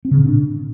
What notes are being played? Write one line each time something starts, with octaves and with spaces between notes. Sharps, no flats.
C4
C#3
A#2
D4